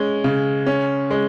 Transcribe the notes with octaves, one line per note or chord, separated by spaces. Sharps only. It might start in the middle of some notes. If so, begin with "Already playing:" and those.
Already playing: G#3 C#4
C#3
C#4
G#3